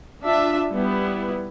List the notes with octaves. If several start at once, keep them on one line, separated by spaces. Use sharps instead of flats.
D4 F4 E5
G3 B3 E4